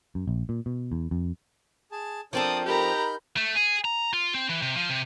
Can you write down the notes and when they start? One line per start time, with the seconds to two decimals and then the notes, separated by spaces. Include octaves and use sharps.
0.15 F#2
0.28 A#1
0.49 A#2
0.66 B2
0.92 E2
1.11 F2
1.92 G#4 A5
2.33 F3 C4 D4 A4 A#4 C5 D5 D#6
2.65 D#4 G4 A#4 A#5 B5 F6 G6
3.36 A3
3.55 G#4
3.85 A#5
4.13 F4
4.34 C4
4.49 E3
4.62 C3
4.75 F3
4.89 C3